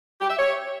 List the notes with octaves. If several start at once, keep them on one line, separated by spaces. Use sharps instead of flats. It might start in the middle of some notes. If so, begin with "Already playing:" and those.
G4
E5
C#5